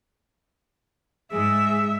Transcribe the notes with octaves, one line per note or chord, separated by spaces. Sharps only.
G#2 G#4 E5